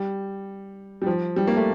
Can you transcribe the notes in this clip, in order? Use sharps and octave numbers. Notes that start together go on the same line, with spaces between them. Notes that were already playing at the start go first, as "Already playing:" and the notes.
Already playing: G3
G3
F3
G3
A#3
A3